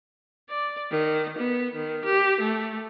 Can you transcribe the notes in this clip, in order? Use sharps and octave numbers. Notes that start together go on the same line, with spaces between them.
D5
D#3
B3
D#3
G4
A3